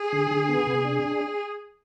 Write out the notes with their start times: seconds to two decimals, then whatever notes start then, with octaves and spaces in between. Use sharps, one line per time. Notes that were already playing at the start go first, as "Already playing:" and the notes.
Already playing: G#4
0.13 D3
0.31 D3
0.49 B3
0.67 C3
0.85 D4